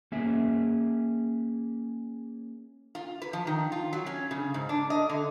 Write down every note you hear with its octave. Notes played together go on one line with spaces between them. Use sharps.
A#3 C#4 G#4 E5
F4
B4
F3
D#3
F4
F#3
C#4
C#3
G#2
D4
D#5
D3